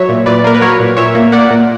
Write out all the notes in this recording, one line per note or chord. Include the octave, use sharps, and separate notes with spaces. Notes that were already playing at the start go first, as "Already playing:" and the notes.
Already playing: F#3 C#5 E5
A#2
A#2 B4 D5
A#3 A#4
B4
F#3 A#4 C#5
A#2
A#2 C#5 E5
A#3
A#3 D5 F#5
A#2